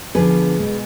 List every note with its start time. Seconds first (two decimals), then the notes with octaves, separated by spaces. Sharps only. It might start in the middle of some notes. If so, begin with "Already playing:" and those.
0.15 D3 F3 B3 G#4 B4
0.59 B2 G#3 B3